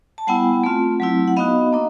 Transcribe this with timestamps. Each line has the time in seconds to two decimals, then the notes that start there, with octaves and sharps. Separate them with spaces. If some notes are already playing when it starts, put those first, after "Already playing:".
0.18 A5
0.27 G3 B3 E4 F#5 G#5
0.63 A3 C4 F4
1.00 F#3 A3 C4 E4
1.28 F#5
1.37 B3 D#4 F#4 D#5 F5
1.73 A#3 D4